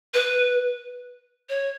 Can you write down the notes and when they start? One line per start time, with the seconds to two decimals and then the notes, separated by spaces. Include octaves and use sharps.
0.14 B4
1.49 C#5